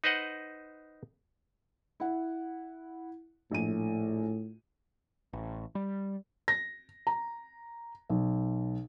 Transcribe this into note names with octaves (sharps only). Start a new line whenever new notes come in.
D#4 B4 C5 D#5 F#5
E4 F#5
A#1 A2 D#7
A1
G3
A#6
A#5
B1